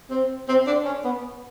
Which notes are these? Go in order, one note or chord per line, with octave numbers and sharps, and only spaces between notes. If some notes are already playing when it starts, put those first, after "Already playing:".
C4
C4
D4
C#4
B3